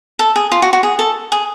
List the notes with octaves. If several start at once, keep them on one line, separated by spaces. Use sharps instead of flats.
A4
G#4
F4
F#4
F#4
G#4
A4
G#4